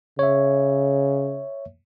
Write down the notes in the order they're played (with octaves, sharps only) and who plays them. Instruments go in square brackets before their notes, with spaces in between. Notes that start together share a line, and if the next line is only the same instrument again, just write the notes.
[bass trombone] C#3 [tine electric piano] C#5 E5